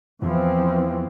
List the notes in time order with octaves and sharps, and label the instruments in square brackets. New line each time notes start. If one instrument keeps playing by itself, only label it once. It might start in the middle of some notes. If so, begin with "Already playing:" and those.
[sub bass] E2 [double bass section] E3 F3 C4